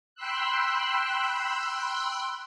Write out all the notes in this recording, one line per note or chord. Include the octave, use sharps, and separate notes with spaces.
G5 B5 C6 E6 F#6